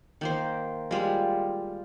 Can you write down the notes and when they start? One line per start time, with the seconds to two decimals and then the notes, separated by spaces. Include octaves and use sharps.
0.21 D#3 A#3 C5
0.91 G3 G#3 F4